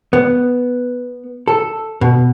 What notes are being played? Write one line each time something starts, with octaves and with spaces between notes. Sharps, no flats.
B3
A4
B2